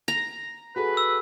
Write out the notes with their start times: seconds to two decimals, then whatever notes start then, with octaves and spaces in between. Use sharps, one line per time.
0.08 A#5
0.76 F#4 G#4 A4 B4
0.97 E6